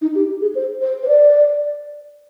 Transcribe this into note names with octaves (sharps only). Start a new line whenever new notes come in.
D#4
G4
G#4
C5
C5
C5
D5